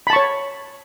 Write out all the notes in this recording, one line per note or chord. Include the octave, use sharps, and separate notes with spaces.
C#5 A5 B5 C#6